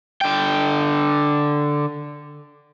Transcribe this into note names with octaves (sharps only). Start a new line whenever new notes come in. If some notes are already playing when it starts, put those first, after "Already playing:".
D3 G5